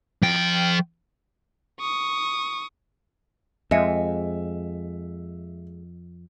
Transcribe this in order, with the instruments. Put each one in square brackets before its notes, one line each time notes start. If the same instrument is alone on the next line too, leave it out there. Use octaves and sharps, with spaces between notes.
[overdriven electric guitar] F3 G5
[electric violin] C#6 D#6
[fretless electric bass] F2 [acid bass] G#3 [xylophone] D#5 G#5 C#7 [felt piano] E5